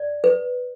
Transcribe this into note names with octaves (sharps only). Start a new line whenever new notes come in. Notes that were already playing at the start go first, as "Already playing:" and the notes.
Already playing: D5
B4